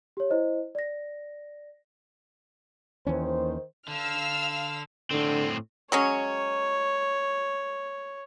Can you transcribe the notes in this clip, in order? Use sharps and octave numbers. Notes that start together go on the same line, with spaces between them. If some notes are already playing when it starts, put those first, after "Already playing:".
G4 C#5
E4 C5 D#5
D5 A#6
D#2 D#3 E3 C#4 C5
D3 F5 E6 F6
A2 D3 C4
F#3 G#3 C#4 C#5